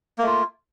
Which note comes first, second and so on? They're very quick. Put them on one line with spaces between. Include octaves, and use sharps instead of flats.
A#3 A3 F4